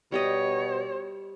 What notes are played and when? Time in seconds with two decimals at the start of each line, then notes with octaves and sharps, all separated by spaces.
0.12 B2 G3 G4 C#5 D#5